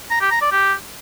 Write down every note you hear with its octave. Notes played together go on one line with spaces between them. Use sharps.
A#5
G4
A#5
D5
G4